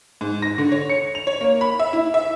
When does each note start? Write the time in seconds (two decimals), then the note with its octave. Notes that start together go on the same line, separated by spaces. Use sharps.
0.21 G#2
0.42 A#6
0.58 D3
0.72 C#5
0.90 C#7
1.15 F7
1.27 C#5
1.41 A#3
1.61 B5
1.80 E5
1.93 E4
2.14 E5